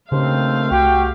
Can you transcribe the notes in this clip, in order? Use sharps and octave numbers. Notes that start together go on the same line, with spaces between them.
D#2 C#3 A3 C4 D4 C5 F5
C2 F#4 G4 G5